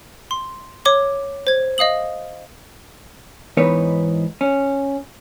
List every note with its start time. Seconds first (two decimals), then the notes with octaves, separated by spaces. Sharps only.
0.31 C6
0.85 C#5 D6 G7
1.47 C5 G#6
1.78 D#5 F5 D#6 F#7
3.57 G#2 E3 B3 D#4 B4 C#5
4.41 C#4